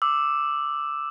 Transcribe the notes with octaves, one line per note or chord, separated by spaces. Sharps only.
D6 E6